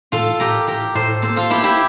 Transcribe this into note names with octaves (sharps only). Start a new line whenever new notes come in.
A2 F4 A4
A2 G4 A#4
A2 G4 A#4
A2 A4 C5
A#3 A4 C5
F4 A4
A#3 E4 G4
E4 G4